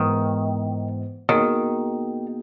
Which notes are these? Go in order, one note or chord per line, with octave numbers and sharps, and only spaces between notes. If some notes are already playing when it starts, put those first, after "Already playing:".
Already playing: G#2 D#3 E3 B3
B2 D#3 A#3 D#4 G#4